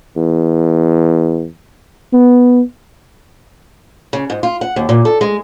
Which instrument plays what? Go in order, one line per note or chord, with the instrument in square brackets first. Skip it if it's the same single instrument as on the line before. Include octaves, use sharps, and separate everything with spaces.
[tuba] E2
B3
[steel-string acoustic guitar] C#3
G#2
F4
F#5
D#2
A#2
A4
G#3